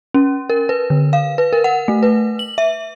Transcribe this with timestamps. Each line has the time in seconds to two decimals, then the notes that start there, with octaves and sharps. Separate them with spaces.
0.14 C#4
0.50 A#4
0.69 B4
0.90 D3
1.13 F5
1.38 B4
1.53 A#4
1.64 F#5
1.88 A3
2.03 B4
2.39 F#7
2.58 E5